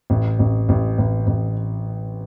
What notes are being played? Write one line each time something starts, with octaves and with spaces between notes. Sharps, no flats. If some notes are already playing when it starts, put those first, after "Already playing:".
A1
A1
A1
A1
A1